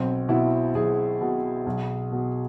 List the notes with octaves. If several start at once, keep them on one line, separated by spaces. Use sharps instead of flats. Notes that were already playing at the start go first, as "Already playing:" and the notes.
Already playing: B1 C4
B2 E4
B1 G#4
B2
B1
B2